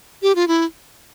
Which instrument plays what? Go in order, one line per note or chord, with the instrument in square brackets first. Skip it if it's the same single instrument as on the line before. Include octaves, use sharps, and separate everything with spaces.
[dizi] G4
F4
E4